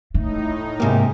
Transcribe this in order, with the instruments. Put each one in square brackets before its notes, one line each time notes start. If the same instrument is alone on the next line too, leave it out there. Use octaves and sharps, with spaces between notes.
[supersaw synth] A2 D#4 [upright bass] A3
[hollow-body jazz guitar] G#2 A#3 [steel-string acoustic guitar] C3 G4